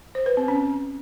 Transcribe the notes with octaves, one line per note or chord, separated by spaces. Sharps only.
C5
B4
C4
C#4